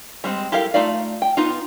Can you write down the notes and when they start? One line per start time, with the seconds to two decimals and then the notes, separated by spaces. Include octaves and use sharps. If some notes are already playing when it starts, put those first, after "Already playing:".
0.24 G3 G#3 C4
0.52 E4 G4 A4 A#4 F5
0.74 A3 D#4 F4 D5 F5
1.22 G5
1.37 B3 D#4 F4